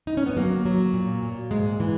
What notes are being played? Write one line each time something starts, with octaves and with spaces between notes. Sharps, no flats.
D#4
C#4
B3
F#3 A#3
F#3
A#2
A#2
G#2 G#3
E3